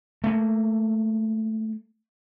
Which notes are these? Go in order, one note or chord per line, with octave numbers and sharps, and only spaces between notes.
A3 A#3